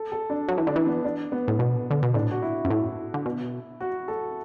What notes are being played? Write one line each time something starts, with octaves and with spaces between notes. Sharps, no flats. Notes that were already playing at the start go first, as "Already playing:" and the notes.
Already playing: A4
A4
D4
F#3
E3
D3 D4
E3
B3
D4
B3
A2
B2
D3
B2
A2 D4
F#4
E4
F#2
A2
D3
B2
F#4
A4